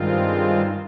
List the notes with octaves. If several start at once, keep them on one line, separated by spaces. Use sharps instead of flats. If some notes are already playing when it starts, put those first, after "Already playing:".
Already playing: G2 D#3 G#3 C4 F4